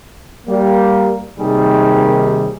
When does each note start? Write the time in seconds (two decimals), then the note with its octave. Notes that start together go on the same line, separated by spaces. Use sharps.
0.47 G3 A#3
1.38 D#2 C3 D#3 G3 G#4